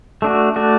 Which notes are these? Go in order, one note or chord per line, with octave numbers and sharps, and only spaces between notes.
A3 D4 F#4
A3 D4 F#4